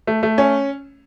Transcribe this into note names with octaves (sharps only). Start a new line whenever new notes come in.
A3
A3
C#4